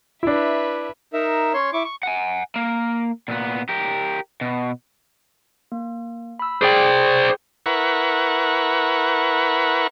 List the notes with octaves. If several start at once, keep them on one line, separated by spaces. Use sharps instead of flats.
D4 E4 B4 E5
D#4 A#4 E5
C#4 C#5 C6
E4 C#6 D6
C#6
F#5 G#5
A#3 A#4
A#2 B3
G4 A#4
B2
A#3
B5 E6
G#4 C5 D5 G5
E4 A#4 B4 F#5 C#6